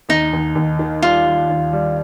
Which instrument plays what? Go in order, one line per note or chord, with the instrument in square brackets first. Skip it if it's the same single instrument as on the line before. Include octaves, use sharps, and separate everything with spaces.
[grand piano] D#2 [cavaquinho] D#4
[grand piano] D#2
D#2
D#3
[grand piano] G3 [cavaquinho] F4
[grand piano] G3
D#2
G3